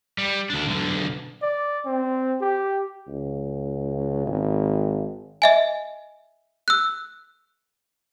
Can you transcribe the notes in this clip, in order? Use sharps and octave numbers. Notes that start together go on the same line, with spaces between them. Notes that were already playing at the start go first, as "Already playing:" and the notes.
G3
D2 D4
B1 D3
D5
C4
G4
C#2
G#1
D#5 E5 G#5
E6 F#6